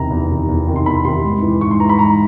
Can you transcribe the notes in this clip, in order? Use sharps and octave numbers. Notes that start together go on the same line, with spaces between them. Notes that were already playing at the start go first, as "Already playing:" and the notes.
Already playing: E2 C3 D#3 A#5
E2
C3 D#3
E2
C3 D#3
C6
E2 B5
C3 D#3 C6
G#2
E3
G#2 C#6
C6
E3 A#5
B5
G#2 A#5